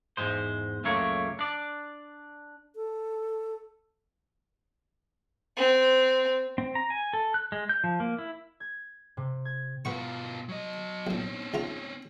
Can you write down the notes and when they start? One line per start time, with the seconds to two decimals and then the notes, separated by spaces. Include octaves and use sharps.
0.17 E2 G#2 G#3 C5
0.84 C#2 F#2 A3 A#3 C#5
1.39 D4 D5
2.76 A4
5.57 C4
6.58 C4
6.75 A#5
6.90 G#5
7.13 A4
7.34 F#6
7.52 G#3
7.69 G6
7.84 F3
8.00 A#3
8.19 E4
8.60 G#6
9.17 C3
9.45 G#6
9.85 B2 F4 B4 F#5 C#6
10.49 F#3 D#5
11.07 B1 A#2 C4 C#4
11.54 C#2 F4 A#5